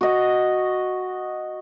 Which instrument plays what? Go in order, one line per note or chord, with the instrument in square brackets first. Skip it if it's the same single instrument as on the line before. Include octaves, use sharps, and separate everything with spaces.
[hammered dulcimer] F#4 D#5